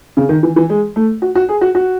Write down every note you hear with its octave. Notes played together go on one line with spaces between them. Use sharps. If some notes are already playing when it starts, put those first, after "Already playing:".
C#3
D#3
E3
E3
G#3
A3
F#4
F#4
G#4
F#4
F#4